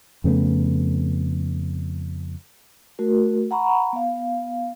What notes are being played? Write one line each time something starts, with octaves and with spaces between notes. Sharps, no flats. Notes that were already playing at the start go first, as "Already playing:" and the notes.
F2 C#3 A3 B3
A3 F#4 A#4
F#5 A#5 B5 C#6
B3 F5